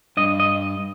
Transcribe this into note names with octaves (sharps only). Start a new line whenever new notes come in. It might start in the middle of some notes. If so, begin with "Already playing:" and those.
G2 D#5
D#5